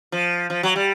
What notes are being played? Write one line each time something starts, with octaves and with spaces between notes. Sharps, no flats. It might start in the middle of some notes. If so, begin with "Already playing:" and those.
F3
F3
F#3
G3